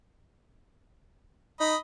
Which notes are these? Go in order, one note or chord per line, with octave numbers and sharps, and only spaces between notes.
D#4 D#5 B5